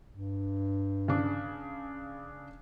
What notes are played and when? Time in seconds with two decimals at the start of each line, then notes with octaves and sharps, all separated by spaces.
0.11 G2
1.08 C#3 D4